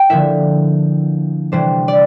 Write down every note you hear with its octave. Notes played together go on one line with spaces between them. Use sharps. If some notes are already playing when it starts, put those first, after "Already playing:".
Already playing: G5
D3 F3 A#3 E4 E5
C3 E3 G3 D4 C5
D5